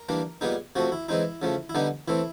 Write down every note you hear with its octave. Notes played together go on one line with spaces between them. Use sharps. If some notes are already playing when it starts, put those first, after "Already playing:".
Already playing: A#4
E3 G3 A#3 D4
A#2 G3 B3 D#4 G#4
C3 F3 A3 F#4
E4
E3 G#3 C4 D#4 E4
C#3 F3 A3
E4
D3 G3 B3 D#4
E3 A3 C4 E4